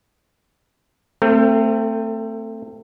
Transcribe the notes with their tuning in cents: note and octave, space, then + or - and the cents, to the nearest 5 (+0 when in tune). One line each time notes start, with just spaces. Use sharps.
A3 +25 C4 +0 A#4 -45